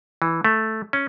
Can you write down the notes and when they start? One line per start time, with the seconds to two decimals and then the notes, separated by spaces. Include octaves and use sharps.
0.22 E3
0.45 A3
0.93 C#4